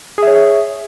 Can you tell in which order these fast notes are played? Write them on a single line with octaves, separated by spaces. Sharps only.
G#4 E5 C#5